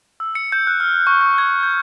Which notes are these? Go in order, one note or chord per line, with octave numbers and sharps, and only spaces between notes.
E6
C#7
G6
F#6
F6
C#6
C#6
G#6
G6